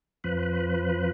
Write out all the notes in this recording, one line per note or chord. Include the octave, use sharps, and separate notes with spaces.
F2 F3 B4